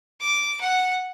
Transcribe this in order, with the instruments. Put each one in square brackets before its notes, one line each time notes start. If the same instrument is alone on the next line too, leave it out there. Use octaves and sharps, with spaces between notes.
[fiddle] D6
F#5